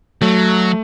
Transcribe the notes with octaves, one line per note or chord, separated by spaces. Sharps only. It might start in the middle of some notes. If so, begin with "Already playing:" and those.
F#3 A3